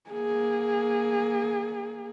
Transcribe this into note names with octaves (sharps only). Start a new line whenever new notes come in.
A#3 G#4